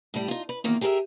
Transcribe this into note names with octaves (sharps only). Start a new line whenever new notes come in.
A2 G3
D#4 F4
B4
E2 D#3 A#3 F4
G4 G#4 A#4 D5 E5